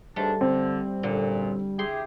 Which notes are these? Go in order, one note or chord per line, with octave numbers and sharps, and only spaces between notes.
C#2 G#2 G3 A3 D4
D3 C4
F#2 A#2 D3
E4 G4 G#4 C6